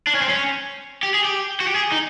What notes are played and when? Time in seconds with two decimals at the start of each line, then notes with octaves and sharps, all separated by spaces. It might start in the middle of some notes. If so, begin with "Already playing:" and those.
0.07 D4
0.15 C#4
0.22 C4
0.29 C#4
1.03 G4
1.14 G#4
1.25 G4
1.60 F#4
1.67 G4
1.75 G#4
1.92 D#4